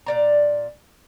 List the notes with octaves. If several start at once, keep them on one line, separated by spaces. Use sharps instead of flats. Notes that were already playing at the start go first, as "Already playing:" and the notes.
A#2 D5 A#5